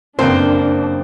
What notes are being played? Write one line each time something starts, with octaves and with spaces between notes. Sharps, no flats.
F#1 F2 A#3 D4 C5 G5 F6